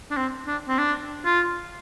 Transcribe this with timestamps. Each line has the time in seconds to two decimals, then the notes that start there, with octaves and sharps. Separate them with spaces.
0.11 D4
0.17 C4
0.47 D4
0.69 C4
0.78 D4
1.25 F4